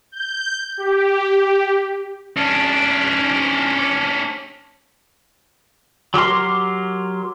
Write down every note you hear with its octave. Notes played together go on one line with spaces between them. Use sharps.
G6
G4
C#4 D4
F#3 G4 A#4 C6